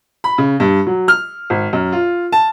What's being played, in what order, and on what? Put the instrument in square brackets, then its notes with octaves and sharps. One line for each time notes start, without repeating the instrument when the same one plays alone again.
[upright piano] B5
C#3
G2
F#3
F6
G#1
F#2
F4
A5